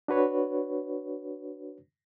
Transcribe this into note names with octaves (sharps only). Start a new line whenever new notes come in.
D4 F#4 B4 C#5